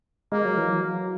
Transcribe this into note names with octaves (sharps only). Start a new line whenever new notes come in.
G#3 A#3
F#3
E3
F#3